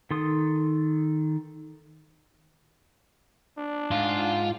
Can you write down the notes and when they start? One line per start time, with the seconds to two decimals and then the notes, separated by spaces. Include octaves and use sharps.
0.11 D#3 A4 C6 D#6
3.58 D4
3.91 G#2 F4